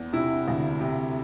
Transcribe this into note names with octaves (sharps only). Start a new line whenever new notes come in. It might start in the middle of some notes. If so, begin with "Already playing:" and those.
Already playing: E2
C3 E4
D2
C3